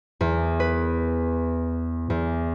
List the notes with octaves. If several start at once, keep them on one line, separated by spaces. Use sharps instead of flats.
E2
B4
E2